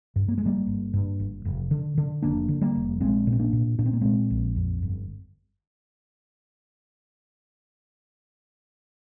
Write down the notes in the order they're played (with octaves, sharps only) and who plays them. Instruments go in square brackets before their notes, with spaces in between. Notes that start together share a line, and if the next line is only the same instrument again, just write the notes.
[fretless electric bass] G2
A#3
G#3
G1 G3 A#3
G1
G2
G1
F1
D3
D3
F1 A#3 D4
D3
G3 A#3
F1
A#1 G#3 C4
A#2
C4
A#3 D4
A#2
A#2 D4
C4
A#3
A#2 G#3 C4
A#1
F2
G1